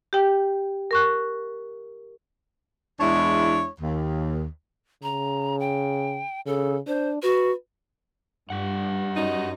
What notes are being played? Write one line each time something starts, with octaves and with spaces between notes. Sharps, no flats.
G4 G5
A#4 C#6 F#6
E2 G#3 D4 E4 C#5
D#2
C#3 A#5
G5
C#3 A4
D4 C5
F#4 B4
G2 G4 F#5
F#2 D#4